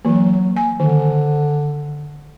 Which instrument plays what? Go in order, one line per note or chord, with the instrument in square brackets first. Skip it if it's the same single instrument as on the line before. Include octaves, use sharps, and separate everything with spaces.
[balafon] E3 A#3 [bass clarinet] F#3
[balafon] G#5
[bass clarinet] D3 [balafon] D#3